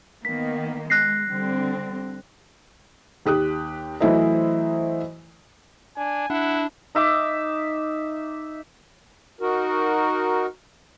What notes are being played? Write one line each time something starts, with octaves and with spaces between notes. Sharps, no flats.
D#3 A#3 B3 B6
G#3 F#6 A#6 C7
D3 G3 C4
D#2 G4 D#6 F#6
E3 F#3 A3 E4 C5 D#5
D4 G#5
D4 E4 F#5
D#4 E5 D6
D#4 F#4 A#4